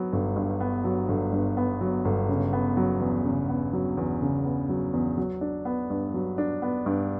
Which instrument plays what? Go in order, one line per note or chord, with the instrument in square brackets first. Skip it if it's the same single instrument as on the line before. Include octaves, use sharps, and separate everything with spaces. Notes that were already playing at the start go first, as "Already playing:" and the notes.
Already playing: [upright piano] F#3 B3
G1
G2
B3
F#3
G1
G2
B3
F#3
G1
C#3
B3
F#3
E2
C#3
B3
F#3
E2
C#3
B3
F#3
E2
F#3
D4
B3
G2
F#3
D4
B3
G2